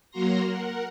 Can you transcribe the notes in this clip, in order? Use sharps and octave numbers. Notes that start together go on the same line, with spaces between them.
F#3 A#3 F#4 A#5 C6 A#6
A#4 F#5